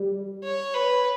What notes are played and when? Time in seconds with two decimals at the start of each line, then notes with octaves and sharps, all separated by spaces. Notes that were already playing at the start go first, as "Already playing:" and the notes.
Already playing: G3
0.44 C#5
0.74 B4